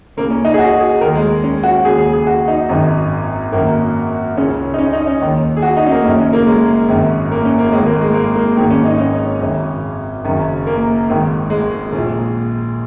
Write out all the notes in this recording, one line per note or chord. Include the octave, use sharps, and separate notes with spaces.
C#2 C#3 A#3
C#4
D#4
G#4
F#4
G#4
D#2 D#3 A#4
G#3
C#4
F#4
D#2 C#3 G#4
G#4
G#4
F#4
D#4
G#1 F#2 D#3
G#1 F#2 D#3 A#3
C#2 C#3 C#4
D#4
C#4
D#4
C#4
D#2 D#3
G#4
F#4
D#4
C#4
A#3
F#1 F#2 D#3 A#3
C#4
A#3
G#3
G#1 F#2 D#3
A#3
C#4
A#3
G#1 G#2 D#3 G#3
A#3
G#3
A#3
A#3
G#1 G#2 D#3 A#3
C#4
D#4
C#4
G#1 F#2 C#3
F#1 F#2 D#3
A#3
G#1 G#2 D#3
G#3
A#1 A#2